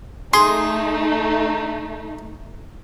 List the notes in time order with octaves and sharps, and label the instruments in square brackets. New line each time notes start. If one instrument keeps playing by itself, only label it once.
[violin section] A3 D#4 [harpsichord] G#4 [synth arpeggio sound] C6